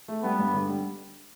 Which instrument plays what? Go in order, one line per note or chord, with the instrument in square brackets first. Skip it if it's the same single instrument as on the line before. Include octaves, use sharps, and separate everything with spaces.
[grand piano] A3
[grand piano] G3 [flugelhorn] B3
[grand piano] G2
D3
G3